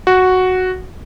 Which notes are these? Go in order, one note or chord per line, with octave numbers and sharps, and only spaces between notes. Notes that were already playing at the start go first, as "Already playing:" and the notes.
F#4